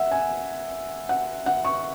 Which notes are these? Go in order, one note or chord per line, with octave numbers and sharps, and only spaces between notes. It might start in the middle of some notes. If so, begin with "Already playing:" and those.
Already playing: E5 F#5
G#5
F#5
F#5
C#6